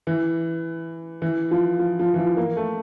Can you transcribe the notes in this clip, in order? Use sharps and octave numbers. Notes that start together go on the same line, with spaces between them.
E3
E3
F3
F3
F3
E3
F3
A#3
A3